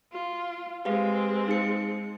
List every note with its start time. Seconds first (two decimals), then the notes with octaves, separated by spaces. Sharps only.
0.12 F4
0.85 G#3 C4 G4 B4 F5
1.48 D#4 C#7